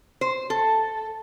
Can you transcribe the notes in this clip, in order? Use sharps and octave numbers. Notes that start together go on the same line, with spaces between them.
C5
A4